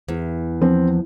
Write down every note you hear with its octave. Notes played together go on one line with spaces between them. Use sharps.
E2
F3 C4